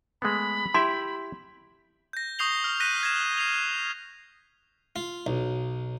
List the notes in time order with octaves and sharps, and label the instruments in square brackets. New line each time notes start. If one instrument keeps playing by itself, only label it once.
[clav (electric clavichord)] G#3 A3 B3 [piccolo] B5
[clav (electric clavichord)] E4 G4 E5 [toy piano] C6
[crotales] G6 A#6
C#6 D#6 G6 C7 F7 G7
F6
F#6 A#6 B6 D#7 F7
G#6 A#6 E7
C7 F7
[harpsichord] F4
B1